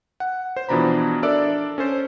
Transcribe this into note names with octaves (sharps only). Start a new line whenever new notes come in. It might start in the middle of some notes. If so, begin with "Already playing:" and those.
F#5
C5
B2 E3 F3 D4 A#5 B5
D4 A4 A#4 D5 E5
C#4 A4 C5